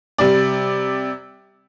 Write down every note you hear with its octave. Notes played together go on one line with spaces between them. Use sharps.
C3 G3 D5